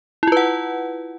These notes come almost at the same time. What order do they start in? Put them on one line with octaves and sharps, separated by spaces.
E4 F4 B4 F#5